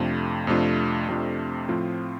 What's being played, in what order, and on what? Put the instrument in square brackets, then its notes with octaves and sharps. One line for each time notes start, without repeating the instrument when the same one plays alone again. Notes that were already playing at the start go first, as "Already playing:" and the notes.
Already playing: [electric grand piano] F2 C3 A3 D4 F4
F2 C3 A3 D4 F4
F2 C3 A3 D4 F4
A2 F3 C4 F4